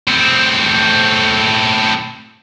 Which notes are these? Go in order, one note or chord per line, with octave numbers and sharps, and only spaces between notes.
A2 C4